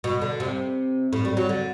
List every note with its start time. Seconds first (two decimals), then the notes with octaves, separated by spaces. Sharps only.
0.04 B2
0.22 D3
0.40 C3
1.13 A2
1.25 G3
1.37 F#3
1.49 D3